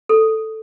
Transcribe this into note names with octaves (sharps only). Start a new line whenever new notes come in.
A4